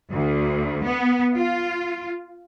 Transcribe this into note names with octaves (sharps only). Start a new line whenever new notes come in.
D2
B3
F4